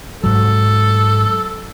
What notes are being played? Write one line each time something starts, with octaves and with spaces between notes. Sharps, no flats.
G#2 F#3 A4